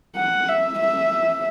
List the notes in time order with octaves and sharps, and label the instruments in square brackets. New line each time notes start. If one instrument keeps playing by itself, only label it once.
[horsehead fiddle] F#5
E5
E5